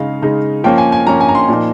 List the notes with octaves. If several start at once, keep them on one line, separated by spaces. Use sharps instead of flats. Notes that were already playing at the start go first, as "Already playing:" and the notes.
Already playing: C#3 G#3 D#4 F5
C#3 G#3 D#4
F3 A#3 C#4 G5
G#5
G#5
F3 A#3 C#4 A#5
G#5
A#5
C6
A#2 F3 A#3 D#4